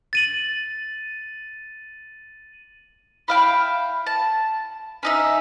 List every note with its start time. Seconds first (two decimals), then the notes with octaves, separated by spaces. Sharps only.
0.13 A6 D#7 F#7
3.28 E4 F5 G5
4.07 A5
5.03 C#4 D#4 E5